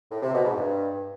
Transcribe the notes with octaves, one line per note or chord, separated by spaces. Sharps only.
A2
C3
B2
G#2
G2